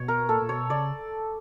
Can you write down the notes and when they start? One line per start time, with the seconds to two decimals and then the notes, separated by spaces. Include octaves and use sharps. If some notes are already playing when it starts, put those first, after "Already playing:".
Already playing: B2 C#5
0.08 A#4
0.29 A#2 A4
0.42 A#2
0.49 B2 C#5
0.70 C#3 D5